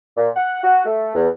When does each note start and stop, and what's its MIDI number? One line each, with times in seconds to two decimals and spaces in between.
0.17 0.29 46
0.36 0.63 78
0.64 0.85 66
0.86 1.11 57
1.15 1.28 40